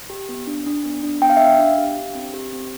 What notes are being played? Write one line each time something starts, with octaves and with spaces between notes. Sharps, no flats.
G4
B3
D4
D4
B3
D4
B3 G5
F5
E5
D4 F5
D4
G4
G4
C4
G4
C4